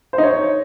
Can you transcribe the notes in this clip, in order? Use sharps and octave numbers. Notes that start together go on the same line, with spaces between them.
C5
D#4
C#5